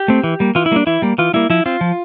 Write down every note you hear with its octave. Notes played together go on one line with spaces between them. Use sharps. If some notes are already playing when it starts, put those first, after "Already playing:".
Already playing: G4
A3 C4
E3
G3 A#3
E3 F4
E4
G3 A#3 D4
E3 E4
G3 A#3
E3 F4
G3 A#3 E4
F3 E4
C4 F4
F3